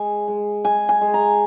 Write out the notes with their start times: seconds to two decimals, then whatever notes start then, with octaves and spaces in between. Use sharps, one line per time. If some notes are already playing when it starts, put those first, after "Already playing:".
Already playing: G#3 G#5
0.28 G#3
0.64 G#3 G#5
0.89 G#5
1.01 G#3
1.14 A#5